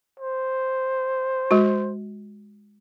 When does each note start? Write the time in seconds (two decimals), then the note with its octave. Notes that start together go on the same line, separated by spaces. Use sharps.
0.20 C5
1.51 G#3 F#4